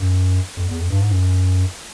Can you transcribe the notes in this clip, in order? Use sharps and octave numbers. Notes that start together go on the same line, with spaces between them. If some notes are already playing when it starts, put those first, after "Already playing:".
Already playing: F#2
F2
E2
F2
G2
G#2
F#2